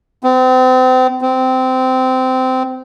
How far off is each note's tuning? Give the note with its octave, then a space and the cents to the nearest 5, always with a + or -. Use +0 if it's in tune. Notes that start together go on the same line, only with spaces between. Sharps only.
C4 -35
C4 -20